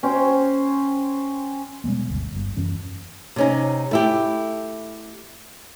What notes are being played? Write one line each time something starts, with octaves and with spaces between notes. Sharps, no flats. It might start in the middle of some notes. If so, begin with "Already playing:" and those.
C#4 C5 G5
B2 G3 G#3 B3
G1 D2
G1 G2
F#2 E3 C#4
C3 C#4 D#4
A3 E4 G4